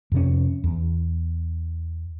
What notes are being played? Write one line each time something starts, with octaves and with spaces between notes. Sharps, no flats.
F2 C3 C#4
E2